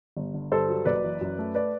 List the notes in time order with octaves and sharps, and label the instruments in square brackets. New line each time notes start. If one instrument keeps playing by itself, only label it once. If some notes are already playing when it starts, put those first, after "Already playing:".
[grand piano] G1
D3
G2 A4 C5
F#3
F#1 B4 D5
E3
F#2
A3
B4 D5